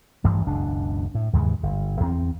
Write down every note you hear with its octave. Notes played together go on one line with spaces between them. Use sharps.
A1 G2 E3 F3
F#1 C#2 B2 D4
A2
D#2 G#2 C#3 E3
G1
E2 C4